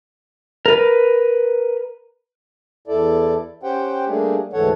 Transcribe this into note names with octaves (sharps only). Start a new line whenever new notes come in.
A#4 B4
E2 E4 A4 D5
C#4 G4 C5 F#5 G5
G3 A3 A#3 D4 G#4
D2 G#2 E3 A4 C#5 F#5